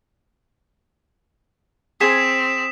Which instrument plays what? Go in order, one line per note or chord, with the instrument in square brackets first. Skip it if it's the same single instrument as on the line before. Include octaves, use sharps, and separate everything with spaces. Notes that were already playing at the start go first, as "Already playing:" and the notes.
[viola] C4 [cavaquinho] G#4 C5 G#5 [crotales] D#6 B6 E7